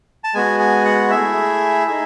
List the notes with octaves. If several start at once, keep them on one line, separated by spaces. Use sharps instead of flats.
A5
G#3 B3 F#4 G#5
G#5
F#5
A3 E4 G#4 E5
D#4 G#4